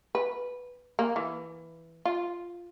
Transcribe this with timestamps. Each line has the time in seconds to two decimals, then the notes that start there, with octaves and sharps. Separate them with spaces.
0.15 B4
0.99 A#3
1.16 E3
2.05 F4